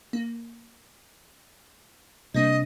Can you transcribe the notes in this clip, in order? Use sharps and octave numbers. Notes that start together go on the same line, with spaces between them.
A#3
C3 G3 A#3 D4 D#5